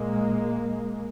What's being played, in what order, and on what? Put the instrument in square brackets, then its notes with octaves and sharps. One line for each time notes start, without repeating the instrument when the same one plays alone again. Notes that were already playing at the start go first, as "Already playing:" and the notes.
Already playing: [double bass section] A#2 G#3 A#3